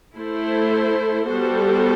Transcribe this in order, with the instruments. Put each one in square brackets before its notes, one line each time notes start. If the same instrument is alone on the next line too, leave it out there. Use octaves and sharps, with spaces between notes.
[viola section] A3 E4 A4 C5
G3 B3 F#4 A4 C5